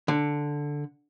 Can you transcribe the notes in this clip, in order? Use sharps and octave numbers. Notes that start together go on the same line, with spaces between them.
D3